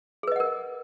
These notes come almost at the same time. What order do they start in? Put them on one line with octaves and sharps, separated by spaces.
G#4 B4 D#5 F#5 A#4